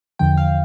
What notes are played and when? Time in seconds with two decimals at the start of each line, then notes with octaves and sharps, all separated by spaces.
0.19 E2 D3 F3 G5
0.37 F5